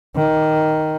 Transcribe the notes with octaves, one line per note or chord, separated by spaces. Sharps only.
D#3